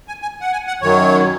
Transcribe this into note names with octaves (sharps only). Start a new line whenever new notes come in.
G#5
G#5
F#5
G#5
F#5
F#2 D#3 F#3 C#5